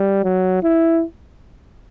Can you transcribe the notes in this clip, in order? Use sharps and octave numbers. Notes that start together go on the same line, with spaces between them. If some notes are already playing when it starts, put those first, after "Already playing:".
Already playing: G3
F#3
E4